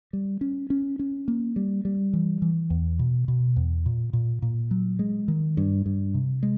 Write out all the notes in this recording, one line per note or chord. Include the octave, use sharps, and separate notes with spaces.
G3
C#4
C#4
C#4
A#3
G3
G3
E3
E3
E2
B2
B2
E2
A#2
A#2
A#2
F#3
G#3
D#3
G2
G2
C3
G#3